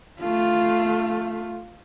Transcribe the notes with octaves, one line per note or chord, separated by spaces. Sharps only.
A3 F4